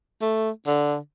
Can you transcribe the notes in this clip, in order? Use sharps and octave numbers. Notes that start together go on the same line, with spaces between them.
A3
D3